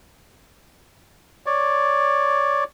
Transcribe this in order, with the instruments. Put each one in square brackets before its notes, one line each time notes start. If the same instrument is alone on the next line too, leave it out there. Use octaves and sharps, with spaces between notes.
[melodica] C#5 D5